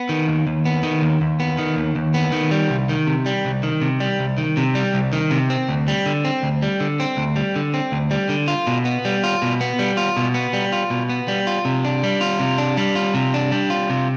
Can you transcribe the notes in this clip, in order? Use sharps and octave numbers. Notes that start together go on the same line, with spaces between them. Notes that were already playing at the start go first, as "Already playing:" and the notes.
Already playing: B3
D#3
D#2
D#2
B3
D#3
D#2
D#2
B3
D#3
D#2
D#2
B3
D#3
G3
C2
D#3
C3
G3
C2
D#3
C3
G3
C2
D#3
C3
G3
C2
D#3
C3
C4
D2
G3
D3
C4
D2
G3
D3
C4
D2
G3
D3
C4
D2
G3
D3
F4
B2
B3
G3
F4
B2
B3
G3
F4
B2
B3
G3
F4
B2
B3
G3
F4
C3
D4
G3
F4
C3
D4
G3
F4
C3
D4
G3
F4
C3